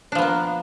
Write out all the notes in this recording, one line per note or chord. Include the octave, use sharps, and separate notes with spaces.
F3 A#3 B3 D4